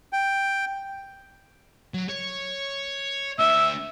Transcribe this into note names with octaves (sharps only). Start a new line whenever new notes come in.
G5
F#3
C#5
A3 D4 E5 E6